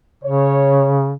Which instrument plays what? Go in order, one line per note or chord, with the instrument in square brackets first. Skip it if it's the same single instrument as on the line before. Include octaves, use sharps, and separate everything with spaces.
[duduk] C#3 [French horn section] C#5